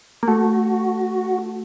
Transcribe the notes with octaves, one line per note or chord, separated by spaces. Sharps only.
A#3
A3 F#4